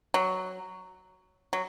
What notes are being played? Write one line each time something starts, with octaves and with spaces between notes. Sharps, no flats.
F#3
F#3